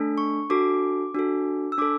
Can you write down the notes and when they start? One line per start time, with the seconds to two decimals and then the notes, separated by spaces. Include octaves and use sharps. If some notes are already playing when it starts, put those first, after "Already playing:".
Already playing: A3 D4 A4
0.18 C#6
0.50 D4 F#4 A4 D6
1.15 D4 F#4 A4
1.72 E6
1.78 D4 A4 D6